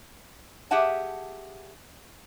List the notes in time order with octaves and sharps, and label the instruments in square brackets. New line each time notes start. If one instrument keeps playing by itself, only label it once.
[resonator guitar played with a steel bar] G4 G#4 E5 F#5 A5